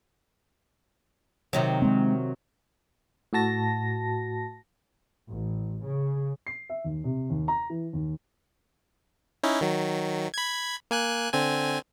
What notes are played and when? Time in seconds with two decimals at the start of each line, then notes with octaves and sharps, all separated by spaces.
1.53 C3 D#3 F#3
1.82 G#3 C4
3.33 A2 F#4 A5 A#6
5.28 A1
5.84 C#3
6.47 C7
6.69 E5
6.84 D#2
7.04 C3
7.30 D#2
7.48 A#5
7.70 E3
7.93 D#2
9.43 C#4 D#4 E4
9.61 D#3 F#3
10.34 B5 G#6
10.91 A#3 G#5 F#6
11.33 D3 C4 G#5